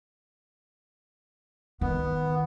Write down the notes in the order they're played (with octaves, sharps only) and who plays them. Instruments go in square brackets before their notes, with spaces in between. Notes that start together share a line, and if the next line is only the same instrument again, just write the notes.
[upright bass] D#3 [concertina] B3